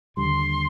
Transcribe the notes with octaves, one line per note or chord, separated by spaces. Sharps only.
D#2 D3 G3 C6